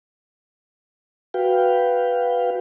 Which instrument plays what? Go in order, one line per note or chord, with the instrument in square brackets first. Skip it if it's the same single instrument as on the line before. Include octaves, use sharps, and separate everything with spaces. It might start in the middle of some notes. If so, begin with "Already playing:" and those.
[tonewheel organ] F#4 B4 F5 G5